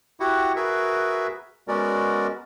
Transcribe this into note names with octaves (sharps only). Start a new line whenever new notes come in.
E4 F#4 G4 F#5
F#4 G#4 A#4 B4 E5
G#3 B3 C#4 F#4 A#4 D5